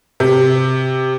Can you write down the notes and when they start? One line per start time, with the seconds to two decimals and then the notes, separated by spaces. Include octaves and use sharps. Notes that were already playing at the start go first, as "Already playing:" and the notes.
0.20 C3